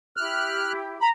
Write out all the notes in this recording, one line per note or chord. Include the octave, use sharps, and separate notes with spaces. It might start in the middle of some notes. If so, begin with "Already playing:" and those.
E4 G4 F6 F#6
A#5 B5